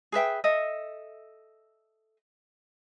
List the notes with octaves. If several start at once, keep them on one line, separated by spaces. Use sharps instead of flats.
G#4 B4 E5 G5
A4 D#5 E5